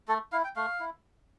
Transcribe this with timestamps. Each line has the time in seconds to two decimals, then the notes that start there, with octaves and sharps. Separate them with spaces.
0.08 A3 A4
0.32 E4 F5
0.44 G5
0.56 A3 F5
0.80 E4